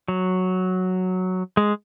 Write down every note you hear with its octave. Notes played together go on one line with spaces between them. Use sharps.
F#3
G#3